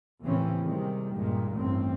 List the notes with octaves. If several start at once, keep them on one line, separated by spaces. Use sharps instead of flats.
D#2 A2 C#3 E3 C4 C#4
C3 D#3 G3 G#3
C#2 G2 A#2 D#3 G#3
A1 E2 G2 C4